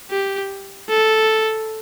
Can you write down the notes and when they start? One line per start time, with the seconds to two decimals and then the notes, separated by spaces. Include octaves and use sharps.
0.11 G4
0.89 A4